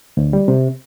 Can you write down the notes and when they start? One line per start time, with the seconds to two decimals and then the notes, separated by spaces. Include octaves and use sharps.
0.17 D2
0.33 G3
0.48 C3